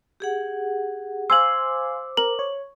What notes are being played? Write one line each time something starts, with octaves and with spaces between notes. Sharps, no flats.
G4 G#4 F#5
C5 F5 G#5 C6 D6 E6 F#7
A#4 F#7
C#5